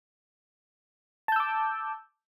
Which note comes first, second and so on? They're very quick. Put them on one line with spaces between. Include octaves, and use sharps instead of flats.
A5 G6 E6 D6